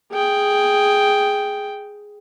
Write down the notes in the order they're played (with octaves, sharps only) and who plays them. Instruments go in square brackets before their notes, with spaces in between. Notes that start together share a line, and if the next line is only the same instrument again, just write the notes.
[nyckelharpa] G#4 G5